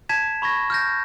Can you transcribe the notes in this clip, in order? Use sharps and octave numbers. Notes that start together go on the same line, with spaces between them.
A5 G#6 B6 E7
B5 C#6 G#6 A#6
F6 G6 A#6